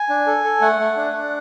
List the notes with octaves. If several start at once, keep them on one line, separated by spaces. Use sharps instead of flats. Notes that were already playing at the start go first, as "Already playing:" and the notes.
Already playing: G#5
D4
A4
A4
A3 F#5
A3
D4
D4